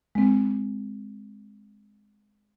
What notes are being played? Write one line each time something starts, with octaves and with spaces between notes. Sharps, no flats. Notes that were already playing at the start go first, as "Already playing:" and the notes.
G#3 C4